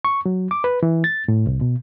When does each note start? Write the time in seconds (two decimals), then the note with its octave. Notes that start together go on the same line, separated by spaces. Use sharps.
0.05 C#6
0.26 F#3
0.51 D6
0.64 B4
0.83 E3
1.04 A6
1.28 A2
1.47 C2
1.61 B2